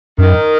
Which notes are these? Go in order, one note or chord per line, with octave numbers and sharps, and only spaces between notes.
F#2 D#3